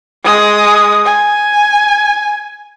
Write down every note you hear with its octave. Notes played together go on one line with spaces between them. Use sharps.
G#3 D#6
G#5